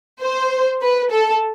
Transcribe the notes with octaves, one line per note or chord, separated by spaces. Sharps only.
C5
B4
A4